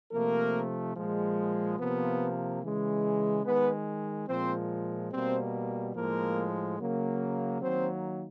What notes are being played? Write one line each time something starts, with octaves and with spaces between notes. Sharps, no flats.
C3 F3 A3 A#3 A#4
A#2 F3 G#3
C3 F3 A#3 B3 B4
C#3 E3 G#3
D#3 G#3 B3 B4
A#2 F3 G#3 C4 C5
B2 G3 A#3 C4 C5
A2 F3 G#3 A#3 A#4
C#3 F#3 A#3
D#3 F#3 A#3 C4 C5